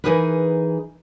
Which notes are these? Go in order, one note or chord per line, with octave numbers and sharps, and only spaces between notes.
E3 F#3 D#4 G#4 A#4 B4